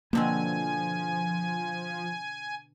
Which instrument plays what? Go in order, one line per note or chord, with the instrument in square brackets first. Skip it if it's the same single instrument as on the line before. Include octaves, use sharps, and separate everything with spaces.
[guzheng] B2 D3 C4 [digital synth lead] F3 [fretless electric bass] A#3 [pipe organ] G#5